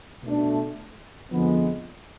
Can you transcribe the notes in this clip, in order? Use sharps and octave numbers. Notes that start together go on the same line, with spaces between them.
B2 A3 D4
F2 D3 F3 G#3 B3